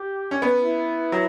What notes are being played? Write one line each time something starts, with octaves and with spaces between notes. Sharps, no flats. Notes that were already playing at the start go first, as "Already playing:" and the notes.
Already playing: G4
C#4
B3
E4
F#3